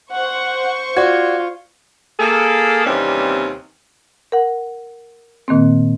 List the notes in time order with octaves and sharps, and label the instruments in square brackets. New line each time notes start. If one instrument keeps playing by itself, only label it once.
[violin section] C5 C#6 [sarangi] F#5
[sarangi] F4 [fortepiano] F#4 [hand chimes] D5 G#6
[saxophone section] A#3 G#4 A4
D#2 C3 E3 G3 C4 C#4
[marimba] A#4 F#5
A#2 D#3 A#3 C4